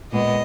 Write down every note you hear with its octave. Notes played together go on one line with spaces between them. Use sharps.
A#2 G#3 B3 D#5